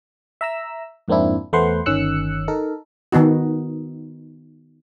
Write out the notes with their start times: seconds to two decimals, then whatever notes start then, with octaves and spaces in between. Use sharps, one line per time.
0.41 E5 A#5 E6
1.08 F2 G#2 A#3 C4 D4 E4
1.53 E2 A3 B4 C5 F#5 C6
1.86 G1 D#3 C#4 E6 F#6 C#7
2.48 D#4 A4 A#4
3.12 D#3 B3 D#4 F#4